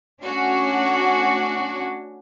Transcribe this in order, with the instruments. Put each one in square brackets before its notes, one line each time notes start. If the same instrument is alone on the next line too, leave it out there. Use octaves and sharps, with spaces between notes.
[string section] A3 C#4 F#4 [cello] D4